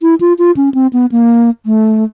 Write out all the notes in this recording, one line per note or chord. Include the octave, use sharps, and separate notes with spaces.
E4
F4
F4
C#4
C4
B3
A#3
A3